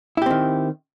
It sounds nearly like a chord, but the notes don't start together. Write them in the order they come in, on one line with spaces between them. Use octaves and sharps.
E4 G4 C4 D#3